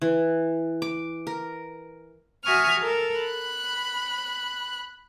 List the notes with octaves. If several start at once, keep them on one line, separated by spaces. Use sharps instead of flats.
E3
D6
A#4
F#4 E5 G#5 C#6 D#6 F6
A4 A#4
B5 F#6